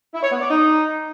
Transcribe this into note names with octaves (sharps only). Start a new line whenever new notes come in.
E4
C#5
B3
D5
D#4